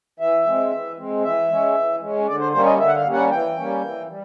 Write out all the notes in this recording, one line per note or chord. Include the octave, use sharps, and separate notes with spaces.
E3 E5
G#3 C4
E3
G#3 C4
E3 E5
G#3 C#4
E3
G#3 C#4
D3 D5
C5
G3 A#3 C#4 C5
D#5
D3 E5
F#5
F5
G3 A#3 C#4
F#5
E3 G5
G3 A#3 C#4
E3
G3